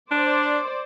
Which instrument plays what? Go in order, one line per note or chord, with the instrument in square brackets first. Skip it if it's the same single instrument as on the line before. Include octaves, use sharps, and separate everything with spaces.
[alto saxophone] D4 [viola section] C5 D5